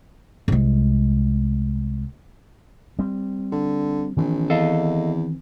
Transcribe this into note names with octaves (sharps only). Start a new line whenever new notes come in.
C2 G#3
G3 C4
D3
A#1 D#3 E3 C4
E2 A4 D#5 F5